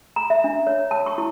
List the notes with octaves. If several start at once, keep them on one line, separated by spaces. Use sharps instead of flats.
A#5
E5
D4
C#5
A5
C#6
E4